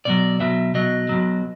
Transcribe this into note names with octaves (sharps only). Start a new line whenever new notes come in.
B1 B2 F#3 D5
B1 B2 F#3 E5
B1 B2 F#3 D#5
B1 B2 F#3